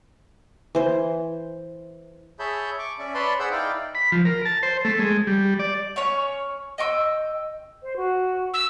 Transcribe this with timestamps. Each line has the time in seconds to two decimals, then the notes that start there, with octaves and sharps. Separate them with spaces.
0.75 E3 C5
2.39 G#4 C#5 E5 A5 B5 G6
2.79 C#6 D6
2.99 C#4 D5 E5
3.14 B4 C#5 D5 A5 B5 C6
3.39 G#4 C5 F#5 B5 E6 G6
3.51 D#4 E4 D5 F5 G5
3.95 B5
4.12 F3
4.25 A#4
4.45 A5
4.63 C5
4.85 A3
5.00 G#3
5.27 G3
5.59 D5
5.96 C#4 C#5
6.78 D#5 G5 C#6 E6
7.82 C5
7.96 F#4
8.53 E6